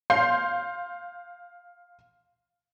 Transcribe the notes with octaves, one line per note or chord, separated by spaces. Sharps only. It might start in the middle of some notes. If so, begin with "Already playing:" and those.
F5 C6 G6 C7